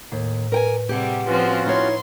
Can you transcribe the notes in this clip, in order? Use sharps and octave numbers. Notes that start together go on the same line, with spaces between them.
D#2 A2
A#4 B4 G5 G#5
C3 G3 G4 G#4 F#5
F3 C4 C#4 F4 F#4 B4
D#4 E4 C#5 C6